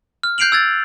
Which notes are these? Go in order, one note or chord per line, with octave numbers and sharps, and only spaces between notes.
F6
F#6 G6 C7 D7 F7 F#7
E6 G#6 A6